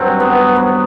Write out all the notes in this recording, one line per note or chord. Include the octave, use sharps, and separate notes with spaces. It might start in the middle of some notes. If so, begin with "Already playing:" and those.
Already playing: G2 F#3 C4
B3
B3